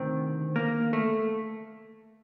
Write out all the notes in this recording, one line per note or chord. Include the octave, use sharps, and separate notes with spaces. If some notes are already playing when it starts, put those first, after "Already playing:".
Already playing: D2 C3 D#3 C4
A#3
A3